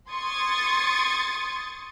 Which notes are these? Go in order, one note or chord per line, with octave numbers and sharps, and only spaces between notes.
C6 C#6 D#6 G#6 A6 C#7